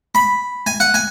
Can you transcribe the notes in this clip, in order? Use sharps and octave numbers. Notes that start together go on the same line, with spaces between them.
B5
G#5
F#5
G#5